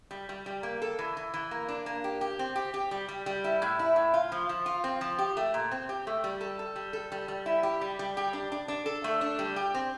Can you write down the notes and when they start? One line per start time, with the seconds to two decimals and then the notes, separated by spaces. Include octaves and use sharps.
0.11 G3
0.29 G3
0.46 G3
0.63 A#3
0.82 A4
0.99 E3
1.17 E3
1.34 E3
1.51 A#3
1.68 D4
1.86 A#3
2.04 G4
2.21 G4
2.39 C4
2.56 G4
2.74 G4
2.91 G3
3.09 G3
3.26 G3
3.44 E4
3.62 A2
3.79 E4
3.96 A2
4.14 F4
4.32 F3
4.49 F3
4.66 F4
4.84 C4
5.01 F3
5.18 G4
5.37 A3
5.54 A#2
5.71 C4
5.89 G4
6.07 A3
6.24 G3
6.41 A4
6.59 A4
6.76 G3
6.93 A4
7.12 G3
7.28 G3
7.46 E4
7.63 G4
7.81 G3
7.99 G3
8.17 G4
8.33 D4
8.52 D4
8.68 D4
8.86 A4
9.04 A3
9.21 D4
9.39 G3
9.56 G4
9.74 C4